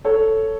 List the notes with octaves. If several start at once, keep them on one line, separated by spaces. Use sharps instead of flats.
A4 C#5